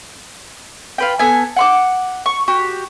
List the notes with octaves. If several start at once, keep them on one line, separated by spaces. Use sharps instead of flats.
F4 B4 G5
B3 A4 G#5
F#5 C6 D6
C#6
F#4 G4